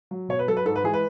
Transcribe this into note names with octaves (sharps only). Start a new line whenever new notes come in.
F#3
B2 C#5
B4
F#3 A4
B4
G#2 A4
B4
E3 G#3 G#4
B4